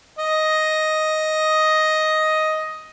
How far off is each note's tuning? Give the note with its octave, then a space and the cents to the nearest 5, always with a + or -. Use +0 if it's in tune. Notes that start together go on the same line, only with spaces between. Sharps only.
D#5 +5